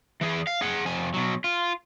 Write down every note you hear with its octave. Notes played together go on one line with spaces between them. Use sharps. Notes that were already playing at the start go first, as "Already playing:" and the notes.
E3 G#4
F5
G#4 F#5
F2 G#5
B2 F#3
F4